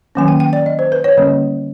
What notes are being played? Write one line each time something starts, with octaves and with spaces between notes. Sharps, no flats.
D#3 F#3 A#3 C#4 G#5
G5
G5
D5
D#5
C5
B4
C#5
D3 G3 A#3 C#4